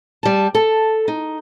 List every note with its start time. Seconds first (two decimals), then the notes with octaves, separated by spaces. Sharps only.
0.23 G3 A5
0.55 A4
1.08 D#4